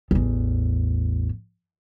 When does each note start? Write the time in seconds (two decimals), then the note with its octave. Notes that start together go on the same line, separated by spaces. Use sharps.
0.11 A1 E2